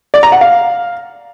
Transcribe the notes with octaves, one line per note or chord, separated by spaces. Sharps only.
D5
A#5
F#5
F5